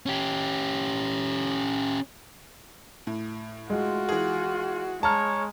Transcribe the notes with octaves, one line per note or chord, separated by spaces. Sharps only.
C#4 G4
A2
G#3 F4 F#4
E3 G#4
G#3 C#5 A5 A#5 F6